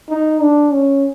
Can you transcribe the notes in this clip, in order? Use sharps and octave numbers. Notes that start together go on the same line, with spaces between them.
D#4
D4
C#4